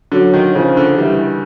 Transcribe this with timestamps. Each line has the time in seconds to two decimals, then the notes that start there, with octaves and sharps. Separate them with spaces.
0.12 D3 F#3
0.34 D#3
0.55 C#3 F3
0.77 D3
0.98 E3 G3